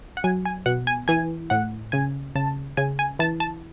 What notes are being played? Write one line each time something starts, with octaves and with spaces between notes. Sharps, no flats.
F#5
F#3 G#5
G#5
B2 F#5
G#5
E3 G#5
A2 F#5
C#3 G#5
C#3 A5
C#3 G#5
G#5
E3 A5
A5